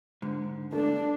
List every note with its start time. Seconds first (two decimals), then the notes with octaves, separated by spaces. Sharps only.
0.22 G#2 D3
0.73 A3 D4